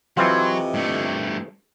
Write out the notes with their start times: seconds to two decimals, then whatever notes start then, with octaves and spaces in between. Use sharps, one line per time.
0.17 F2 C3 E3 F#3 C4 F4 D#5
0.74 G2 A3